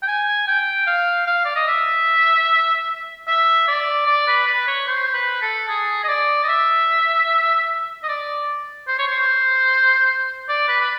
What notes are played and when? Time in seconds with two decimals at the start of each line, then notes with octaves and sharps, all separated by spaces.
0.02 G5
0.07 G#5
0.48 G5
0.87 F5
1.27 F5
1.45 D5
1.56 D#5
1.68 E5
3.27 E5
3.68 D5
4.07 D5
4.28 B4
4.47 B4
4.68 C#5
4.87 C5
5.14 B4
5.42 A4
5.68 G#4
6.04 D#5
6.08 D5
6.44 D#5
6.48 E5
8.03 D#5
8.09 D5
8.88 C5
8.99 C#5
9.08 C5
10.49 D5
10.69 B4
10.81 B4